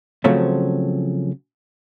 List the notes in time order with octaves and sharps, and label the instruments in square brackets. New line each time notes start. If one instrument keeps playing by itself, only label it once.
[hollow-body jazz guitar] C#3 F3 F#3 A3 C4 C#4